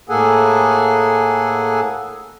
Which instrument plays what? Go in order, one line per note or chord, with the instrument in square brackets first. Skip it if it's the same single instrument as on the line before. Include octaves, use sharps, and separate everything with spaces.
[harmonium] A2 A#3 G#4 A4 F#5 G#5